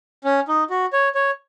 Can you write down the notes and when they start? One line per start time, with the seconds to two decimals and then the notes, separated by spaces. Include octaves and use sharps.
0.24 C#4
0.48 D#4
0.70 F#4
0.93 C#5
1.15 C#5